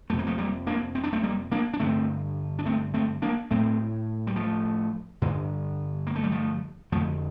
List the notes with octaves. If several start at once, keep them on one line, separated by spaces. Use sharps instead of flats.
F2 C3 A3 A#3
F3 A3
G3 A#3
A#3 D4
C4
D4
A3 C4
G3 A#3
A#3 D4
D4
G2 D3 A3 C4
D4
A3 C4
A3 C4
A#3 D4
A2 A3 C4
G3
F3 A3
G2 D3
A#3
A3
G3
F3 A3
F2 F3 A3
D3